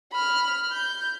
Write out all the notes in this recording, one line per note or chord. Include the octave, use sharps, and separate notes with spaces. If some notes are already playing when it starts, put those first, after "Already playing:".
B5 F6
G6